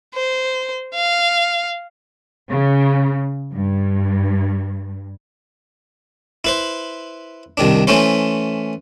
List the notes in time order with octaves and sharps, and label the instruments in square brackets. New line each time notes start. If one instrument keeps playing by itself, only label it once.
[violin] C5
F5
[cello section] C#3
G2
[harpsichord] E4 B4 C5
C2 D#3 D4
E3 A3 C#4 E4 C5